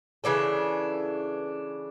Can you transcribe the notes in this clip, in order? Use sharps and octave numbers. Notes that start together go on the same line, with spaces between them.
C#3 E3 D4 A4